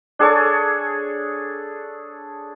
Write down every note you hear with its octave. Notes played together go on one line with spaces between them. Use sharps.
D4 G#4 A4 C#5